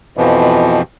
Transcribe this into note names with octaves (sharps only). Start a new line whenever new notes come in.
F2 B2 E3 F3